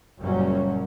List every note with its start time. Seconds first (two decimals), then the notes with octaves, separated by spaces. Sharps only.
0.19 F#1 F#2 A#2 F#3 G3 C#4